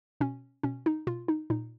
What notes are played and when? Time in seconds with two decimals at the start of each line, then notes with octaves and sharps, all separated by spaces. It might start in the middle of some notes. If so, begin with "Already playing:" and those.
0.21 B2 C#4
0.63 B2 C#4
0.86 D#4
1.07 B2 F4
1.28 D#4
1.50 A#2 D#4